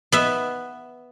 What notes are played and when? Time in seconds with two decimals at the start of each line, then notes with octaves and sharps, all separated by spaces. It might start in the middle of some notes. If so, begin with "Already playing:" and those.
0.12 B3 E5